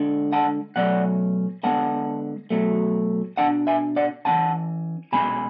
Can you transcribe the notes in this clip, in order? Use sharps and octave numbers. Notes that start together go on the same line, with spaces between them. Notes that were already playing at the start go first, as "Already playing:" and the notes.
Already playing: D3 G#3 D4
F#5 A5
B2 F#3 A3 C#4 D5 F#5
D3 G#3 B3 F#5 A5
B2 F#3 A3
B2 A3 D4 F#5 A5
E5 G#5
D5 F#5
E3 G#3 C#4 F#5 A5
B2 G#3 C#4 G#5 B5